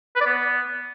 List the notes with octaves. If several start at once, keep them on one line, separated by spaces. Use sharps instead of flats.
B4
D5
B3